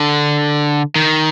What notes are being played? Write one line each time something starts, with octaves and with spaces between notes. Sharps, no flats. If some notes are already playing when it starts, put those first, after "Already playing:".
Already playing: D3
D#3